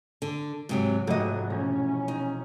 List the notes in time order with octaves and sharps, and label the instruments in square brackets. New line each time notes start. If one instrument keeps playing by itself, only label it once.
[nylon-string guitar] D3
G#2 C3 F#3
[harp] F1 [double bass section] G#2 F#3 [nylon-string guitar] A3 D#5
[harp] E1 [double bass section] C#4
[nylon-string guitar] D#4